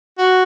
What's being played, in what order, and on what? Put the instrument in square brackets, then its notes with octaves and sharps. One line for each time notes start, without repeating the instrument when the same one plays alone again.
[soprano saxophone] F#4